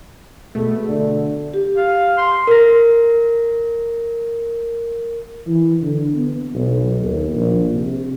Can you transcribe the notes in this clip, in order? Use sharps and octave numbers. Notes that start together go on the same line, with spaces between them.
B2 A3 G#4
D3
G4
F5
C6
A#4 A#6
E3
D3
B3
B1
D#2
A#1
C3